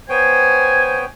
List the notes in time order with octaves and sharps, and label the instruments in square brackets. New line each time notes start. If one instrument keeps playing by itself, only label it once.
[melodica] B3 C#5 G5 [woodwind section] C5 G#5